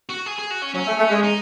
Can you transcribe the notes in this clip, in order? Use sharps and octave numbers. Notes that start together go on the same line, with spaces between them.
F#4
G#4
G#4
F#4
C#4
F#3 C#4
A3
A3
G#3
D#4